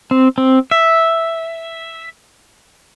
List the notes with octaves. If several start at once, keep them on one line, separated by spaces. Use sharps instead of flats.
C4
C4
E5